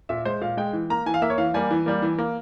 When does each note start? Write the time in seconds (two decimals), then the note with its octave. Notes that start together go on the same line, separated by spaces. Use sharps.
0.09 A#2 E5
0.25 G#3 C5
0.41 A#2 F5
0.57 G#3 G5
0.73 E3
0.90 A#3 A#5
1.06 E3 G#5
1.14 F5
1.22 A#3 E5
1.30 C#5
1.38 E3 F5
1.54 G3 A#3 G#5
1.71 E3
1.86 G3 A#3
2.02 E3
2.18 A#3